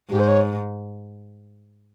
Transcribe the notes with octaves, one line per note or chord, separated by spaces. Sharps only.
G#2 G4
C5
C#5